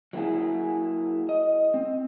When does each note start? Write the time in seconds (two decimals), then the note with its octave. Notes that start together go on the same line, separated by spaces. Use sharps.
0.13 F#3 A#3 C4 D4 E4 G#4
1.29 D#5
1.74 C4